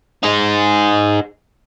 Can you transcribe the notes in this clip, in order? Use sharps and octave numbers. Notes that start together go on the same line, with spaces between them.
D#4 G#4